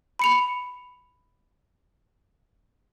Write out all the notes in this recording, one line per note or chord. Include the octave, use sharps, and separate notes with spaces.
B5 C#7 F7